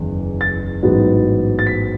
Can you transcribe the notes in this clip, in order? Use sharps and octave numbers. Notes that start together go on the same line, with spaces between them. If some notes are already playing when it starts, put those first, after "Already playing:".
Already playing: F#1 E2 D#3
A6
A1 G#2 F#3 B3
A6
B6